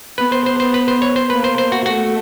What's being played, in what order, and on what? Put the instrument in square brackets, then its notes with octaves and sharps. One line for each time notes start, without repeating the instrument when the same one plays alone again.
[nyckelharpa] B3 [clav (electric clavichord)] B4
[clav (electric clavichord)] C5
C5
C5
B4
C5
C#5
C5
[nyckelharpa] A#3 [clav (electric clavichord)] B4
[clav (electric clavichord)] C5
C5
F#4
[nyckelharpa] A3 [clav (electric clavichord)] F#4